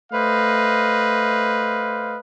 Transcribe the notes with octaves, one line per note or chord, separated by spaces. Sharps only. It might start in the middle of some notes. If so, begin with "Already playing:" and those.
A3 B4 C5 D#5 F5